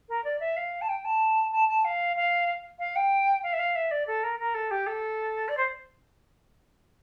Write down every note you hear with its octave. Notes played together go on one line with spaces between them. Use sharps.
A#4
D5
E5
F5
A5
G5
A5
A5
A5
F5
F5
F5
G5
F5
E5
F5
E5
D5
A4
A#4
A#4
A4
G4
A4
D5
C5